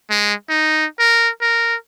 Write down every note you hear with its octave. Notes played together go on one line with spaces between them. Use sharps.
G#3
D#4
A#4
A#4